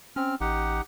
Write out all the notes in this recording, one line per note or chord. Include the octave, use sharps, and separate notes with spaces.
C4 C#4 F6
A1 D#4 G4 F#5